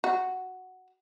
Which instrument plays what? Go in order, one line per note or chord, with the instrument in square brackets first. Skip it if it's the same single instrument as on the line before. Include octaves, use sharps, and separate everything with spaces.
[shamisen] F#4